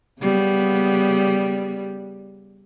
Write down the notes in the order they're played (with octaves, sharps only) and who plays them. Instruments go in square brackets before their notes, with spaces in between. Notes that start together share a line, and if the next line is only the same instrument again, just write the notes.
[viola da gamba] C#3 G3 B3